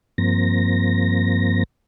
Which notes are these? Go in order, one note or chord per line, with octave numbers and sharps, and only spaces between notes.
G2 F3 A#3 C4 A#6